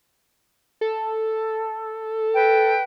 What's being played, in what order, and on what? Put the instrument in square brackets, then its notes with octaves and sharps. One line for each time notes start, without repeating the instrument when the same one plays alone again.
[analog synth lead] A4
[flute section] B4 G5